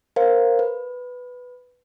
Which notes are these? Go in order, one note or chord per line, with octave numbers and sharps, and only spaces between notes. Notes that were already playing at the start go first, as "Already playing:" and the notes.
A#4 C5 F5
B4